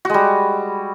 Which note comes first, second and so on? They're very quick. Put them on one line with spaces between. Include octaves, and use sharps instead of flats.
F#4 G#3 G3